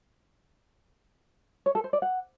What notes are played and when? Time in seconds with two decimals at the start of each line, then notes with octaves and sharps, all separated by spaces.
1.66 C#5
1.75 A4
1.84 C5
1.93 D5
2.02 F#5